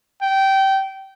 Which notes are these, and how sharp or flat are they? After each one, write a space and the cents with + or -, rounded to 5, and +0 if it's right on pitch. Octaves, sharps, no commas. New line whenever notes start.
G5 -20